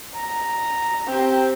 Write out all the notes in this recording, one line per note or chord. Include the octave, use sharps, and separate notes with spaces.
A#5
C4 G4